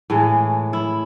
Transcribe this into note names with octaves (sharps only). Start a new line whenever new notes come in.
A2 E3 G#3
E4